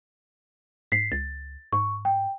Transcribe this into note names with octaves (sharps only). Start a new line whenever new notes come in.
G#2 B6 C7
C#2 A6
G#2 C#6
G5